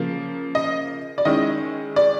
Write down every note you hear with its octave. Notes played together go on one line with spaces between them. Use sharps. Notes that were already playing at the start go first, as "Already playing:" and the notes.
Already playing: C#3 F3 A#3
D#5
D5
D#3 G#3 C#4 E4 D#5
D5